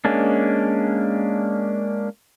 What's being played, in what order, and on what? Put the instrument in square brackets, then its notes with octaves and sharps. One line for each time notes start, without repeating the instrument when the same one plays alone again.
[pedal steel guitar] G#3 A#3 C#4 D4